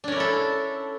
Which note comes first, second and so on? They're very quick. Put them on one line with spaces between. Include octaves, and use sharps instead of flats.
D4 C#4 A#4 E4 A4